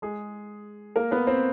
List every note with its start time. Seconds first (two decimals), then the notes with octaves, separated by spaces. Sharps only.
0.02 G#3 G#4
0.96 A#3 A#4
1.11 B3 B4
1.27 C4 C5